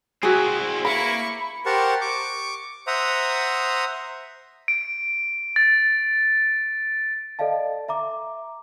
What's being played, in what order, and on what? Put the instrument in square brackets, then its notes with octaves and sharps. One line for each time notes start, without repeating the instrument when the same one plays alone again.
[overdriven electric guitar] C4 E4 [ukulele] F#4 G#4
[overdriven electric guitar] A#3 [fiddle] E4 C#6 [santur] B5
[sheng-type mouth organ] G4 A#4 C5 F#5 A5 C#6
C#6 D6
C5 E5 F#5 A#5 D#6
[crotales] D7
A6
[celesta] A4 D5 D#5 F5 A5
E5 A#5 D6